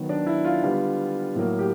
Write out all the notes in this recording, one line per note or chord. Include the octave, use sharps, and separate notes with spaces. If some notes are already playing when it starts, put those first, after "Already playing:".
Already playing: D#3 F#3 B3
D4
E4
F4
D3 G3 B3
A2 F#3 A#3
G4